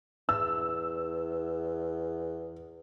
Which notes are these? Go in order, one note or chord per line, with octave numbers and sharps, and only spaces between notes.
E2 E6